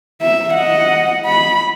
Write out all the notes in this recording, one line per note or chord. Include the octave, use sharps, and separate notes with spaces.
E5
D#5 F#5
B5